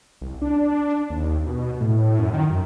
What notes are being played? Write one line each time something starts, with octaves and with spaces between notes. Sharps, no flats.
C2
D4
D#2
B2
A2
F#2
D#3
F#2